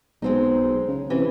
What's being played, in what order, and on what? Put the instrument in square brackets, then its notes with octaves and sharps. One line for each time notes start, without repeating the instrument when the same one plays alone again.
[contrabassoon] B1 [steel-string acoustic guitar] G#3 C4 D#4
[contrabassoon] C#3
[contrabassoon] C3 [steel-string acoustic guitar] E3